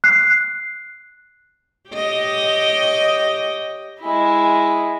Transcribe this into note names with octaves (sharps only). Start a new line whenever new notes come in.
F#6 C7
G4 C#5 D#5
G#3 E4